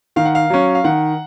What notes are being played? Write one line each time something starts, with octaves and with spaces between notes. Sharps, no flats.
D#3 F5
F#5
F5
F#3 C#4
F5
D#3 F#5